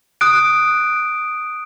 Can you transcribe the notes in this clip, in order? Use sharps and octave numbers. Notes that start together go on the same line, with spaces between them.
D#6 F#6 D7